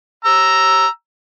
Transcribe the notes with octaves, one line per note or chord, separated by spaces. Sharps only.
A#5 E6